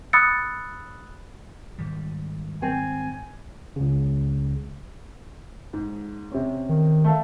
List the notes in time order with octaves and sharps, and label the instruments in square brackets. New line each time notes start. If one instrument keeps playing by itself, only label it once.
[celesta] B5 D#6 E6 F#6 A6 C#7
[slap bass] G#2 D#3 G3
[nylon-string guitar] C4 [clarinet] G#5
[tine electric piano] C#2 C#3
[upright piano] G#2
C3 C4 C#4
[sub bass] D#3
[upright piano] A3 A4 F5